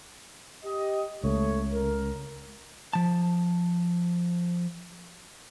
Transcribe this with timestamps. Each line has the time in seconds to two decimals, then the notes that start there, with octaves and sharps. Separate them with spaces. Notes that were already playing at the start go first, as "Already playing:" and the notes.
0.64 G4 D#5
1.24 C#2 A3 C#5
1.72 A#4
2.93 F3 A5